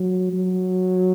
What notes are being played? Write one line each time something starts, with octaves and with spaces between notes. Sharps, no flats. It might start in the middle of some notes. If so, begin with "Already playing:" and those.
Already playing: F#3
F#3